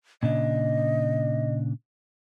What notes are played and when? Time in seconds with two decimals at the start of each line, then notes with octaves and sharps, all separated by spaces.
0.23 A#2 C#3 D4 D#5